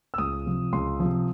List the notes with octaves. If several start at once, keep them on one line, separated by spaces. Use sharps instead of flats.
E6
C#2 D#6
C3 F3
C#2 C6
C3 F3